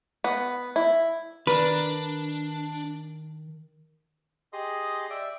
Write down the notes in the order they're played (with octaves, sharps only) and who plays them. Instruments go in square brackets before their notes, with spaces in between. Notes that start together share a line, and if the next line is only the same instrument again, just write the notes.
[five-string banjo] B3
E4
[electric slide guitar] D#3 A#4 A#5 [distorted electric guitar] D4 [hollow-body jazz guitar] B4
[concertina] G4 G#4 D#5 C6 D#6
D5 E5 G5